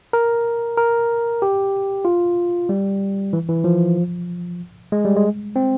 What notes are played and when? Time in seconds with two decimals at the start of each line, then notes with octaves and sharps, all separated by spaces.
0.13 A#4
0.77 A#4
1.42 G4
2.05 F4
2.69 G3
3.33 E3
3.49 E3
3.64 F3
4.92 G#3
5.05 G3
5.16 G#3
5.56 C4